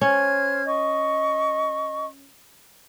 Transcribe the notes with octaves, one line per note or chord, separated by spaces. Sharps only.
C#4 C5 F6 G#6
D#5 C#6